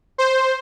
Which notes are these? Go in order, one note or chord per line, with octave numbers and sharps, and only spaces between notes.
C5